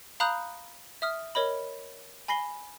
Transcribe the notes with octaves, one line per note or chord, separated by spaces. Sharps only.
F5 A#5 B5 D#6 F#6 G6
E5 D#6 F6
A#4 C#5 D#5 B5
G#5 B5 A#6 C7 G7